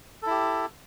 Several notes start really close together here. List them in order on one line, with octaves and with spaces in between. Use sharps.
A4 E4 G4